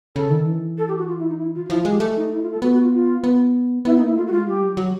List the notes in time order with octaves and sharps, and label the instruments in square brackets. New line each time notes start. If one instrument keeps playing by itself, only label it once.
[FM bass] C#3 [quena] A4
[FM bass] D#3
E3
[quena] A4
G4
F#4
F4
E4
D#4
E4
F4
F4
[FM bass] F3 [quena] E4
[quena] F4
[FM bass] G#3
[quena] G4
[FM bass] A3
[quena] D#4
E4
F4
A4
[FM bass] B3 [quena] F#4
[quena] F#4
F4
F4
[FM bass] B3
[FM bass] B3 [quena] E4
[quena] D#4
[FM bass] A#3 [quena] E4
[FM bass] A3 [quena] F4
[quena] F#4
[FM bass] G#3 [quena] F4
[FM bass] G3 [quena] G4
[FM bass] F#3
F#3